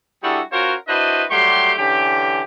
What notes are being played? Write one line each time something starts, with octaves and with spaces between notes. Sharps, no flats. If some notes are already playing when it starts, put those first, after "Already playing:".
G3 D4 E4 F#4 G#4 A4
C#4 F4 F#4 A#4 C5 C#5
D4 E4 F#4 B4 C5 D#5
F#3 G3 A3 G4 C6
D3 E3 C#4 G4